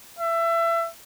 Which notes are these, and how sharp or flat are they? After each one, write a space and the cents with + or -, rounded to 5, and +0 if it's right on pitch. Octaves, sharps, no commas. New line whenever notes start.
E5 +25